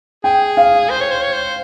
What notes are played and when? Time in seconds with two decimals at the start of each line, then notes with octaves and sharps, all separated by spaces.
0.24 G#4 G5
0.57 F5
0.90 C5
1.01 C#5
1.11 C5
1.22 C#5
1.33 C5